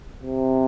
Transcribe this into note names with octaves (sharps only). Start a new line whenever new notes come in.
C3